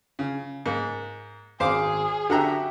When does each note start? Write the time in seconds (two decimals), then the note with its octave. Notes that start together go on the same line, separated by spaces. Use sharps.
0.19 C#3
0.66 G#2 A#3
1.60 G#1 G#4 C5 F5 D6
2.30 D3 F#4 G4 E5 F#5 A#5